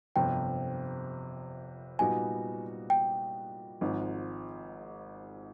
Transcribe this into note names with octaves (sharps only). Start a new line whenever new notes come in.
G1 F2 C3 G5
A#2 G3 B3 D#4 F#4 G#5
G5
G#1 G#2 F3